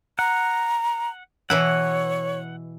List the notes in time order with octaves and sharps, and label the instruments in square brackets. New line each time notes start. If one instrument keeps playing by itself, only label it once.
[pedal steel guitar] F#5 [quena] A#5
[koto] B2 E3 E4 [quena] C#5 [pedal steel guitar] F#5